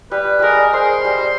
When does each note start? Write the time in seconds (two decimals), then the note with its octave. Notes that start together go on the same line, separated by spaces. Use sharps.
0.11 G3 B4
0.39 G3 G#3 A#4
0.73 G#3 C5
1.05 G3